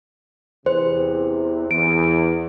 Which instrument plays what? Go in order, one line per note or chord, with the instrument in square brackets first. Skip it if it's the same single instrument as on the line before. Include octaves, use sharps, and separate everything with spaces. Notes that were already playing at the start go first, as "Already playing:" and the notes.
[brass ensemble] E2 C3 [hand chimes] C5
[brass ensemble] E2 [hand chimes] D7